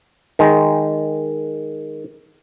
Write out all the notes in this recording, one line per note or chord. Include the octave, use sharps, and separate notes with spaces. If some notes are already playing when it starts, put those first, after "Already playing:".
D#3 G#3